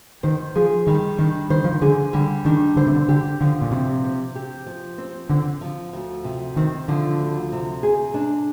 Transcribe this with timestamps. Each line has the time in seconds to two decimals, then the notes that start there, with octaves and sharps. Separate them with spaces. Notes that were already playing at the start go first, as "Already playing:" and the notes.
0.23 D#3 C5
0.56 F3 G#4
0.87 D#3 G3
1.18 D#3 D4
1.50 D#3 C5
1.64 F3
1.73 D#3
1.82 D3 G#4
2.13 D3 G3
2.45 D#3 D4
2.76 D3 C5
2.87 C3
2.95 D3
3.08 D3 G4
3.41 D3 F3
3.61 A#2
3.71 C3 C4
4.04 C5
4.35 G4
4.66 F3
4.98 C4
5.30 D3 C4
5.61 F3
5.93 D2
6.24 C3
6.56 D#3 C4
6.88 D3 F3
7.19 D2
7.52 C3
7.83 G#4
8.14 D4